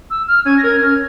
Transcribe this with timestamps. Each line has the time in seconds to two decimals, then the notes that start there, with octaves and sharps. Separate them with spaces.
0.10 E6
0.28 F6
0.46 C#4 G#6
0.58 A#6
0.64 A#4 G#6
0.82 C#4 F6